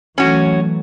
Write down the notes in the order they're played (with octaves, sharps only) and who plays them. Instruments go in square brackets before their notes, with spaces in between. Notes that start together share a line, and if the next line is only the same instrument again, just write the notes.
[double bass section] E3 F#3 A3 [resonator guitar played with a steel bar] C#4 F#4